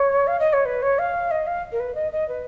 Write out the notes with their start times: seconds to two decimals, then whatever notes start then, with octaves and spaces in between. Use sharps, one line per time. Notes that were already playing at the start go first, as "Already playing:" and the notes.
Already playing: C#5
0.27 F5
0.39 D#5
0.53 C#5
0.65 B4
0.82 C#5
0.98 F5
1.31 D#5
1.47 F5
1.72 A#4
1.80 B4
1.95 D#5
2.12 D#5
2.28 B4